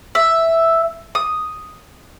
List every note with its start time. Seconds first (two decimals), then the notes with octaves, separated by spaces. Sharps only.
0.15 E5
1.15 D#6